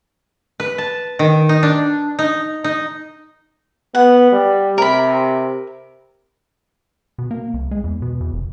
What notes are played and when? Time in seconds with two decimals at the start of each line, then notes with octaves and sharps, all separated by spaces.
0.60 B4
0.78 A5
1.19 D#3
1.49 D#4
1.63 D4
2.19 D#4
2.64 D#4
3.95 B3 F#5
4.32 G3
4.78 C3 A#4 B5
7.18 B2
7.31 A#3
7.54 C2
7.71 G#3
7.84 E2
8.02 B2
8.20 E2
8.33 F1